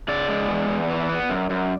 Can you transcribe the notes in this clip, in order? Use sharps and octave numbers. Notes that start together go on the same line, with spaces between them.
C#3 D5
G#3
E2
E2
E3
B3
F#2
F#2